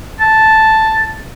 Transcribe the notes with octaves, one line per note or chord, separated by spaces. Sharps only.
A5